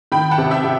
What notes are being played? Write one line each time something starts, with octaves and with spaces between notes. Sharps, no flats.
D#3 G5 B5
F#5 A5
C3
E5 G5
C3